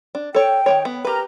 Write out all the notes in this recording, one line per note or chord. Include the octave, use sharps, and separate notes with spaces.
D4
A4 C#5 G5
D#3 A#3 C#5
B3
G4 A#4 B4 A#5